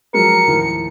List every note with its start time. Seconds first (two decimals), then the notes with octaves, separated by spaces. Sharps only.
0.14 F3 F#3 G#3 A#4 C#7
0.47 D#2 A2 F3